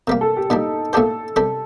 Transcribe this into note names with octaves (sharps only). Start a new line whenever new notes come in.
C3 G3 A#3 A#4
A4
G4
A#2 G3 D4 D#4
A#2 A3 D4 G4 A4 C5
C3 G3 D4 A4